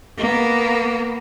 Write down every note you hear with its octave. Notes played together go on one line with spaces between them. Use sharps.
A#3 B3